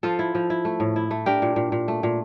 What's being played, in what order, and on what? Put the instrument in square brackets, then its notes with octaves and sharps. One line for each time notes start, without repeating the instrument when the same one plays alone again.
[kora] F3 F4 A4
E4
F3
E4
A3
A2
E4
A3
D4 G4 A#4
A#2
A#2
A#2
A3
A#2